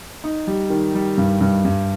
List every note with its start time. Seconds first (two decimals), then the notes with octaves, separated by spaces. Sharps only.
0.24 D#4
0.47 G3
0.70 D#3
0.94 G3
1.18 G2
1.41 G2
1.65 G2